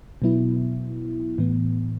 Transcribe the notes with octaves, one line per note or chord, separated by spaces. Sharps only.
B2 F#3 B3 E4
A2 E3 B3